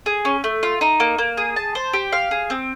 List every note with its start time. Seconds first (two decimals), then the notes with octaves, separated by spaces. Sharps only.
0.06 G#4
0.25 C#4
0.44 A3
0.63 F4
0.81 D#4
1.00 A#3
1.18 A#3
1.37 G#4
1.56 A5
1.75 C5
1.93 G4
2.13 F5
2.31 G#4
2.50 C4